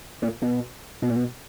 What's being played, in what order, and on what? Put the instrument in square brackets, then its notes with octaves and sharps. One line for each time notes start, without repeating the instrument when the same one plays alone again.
[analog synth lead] A#2
B2
B2
A#2
B2